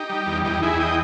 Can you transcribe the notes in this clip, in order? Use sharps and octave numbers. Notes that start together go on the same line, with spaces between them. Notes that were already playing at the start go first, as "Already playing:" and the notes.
Already playing: D#4 G4
G3
E2
E2 D#4 G4
E2 E4 G#4
D#5 G5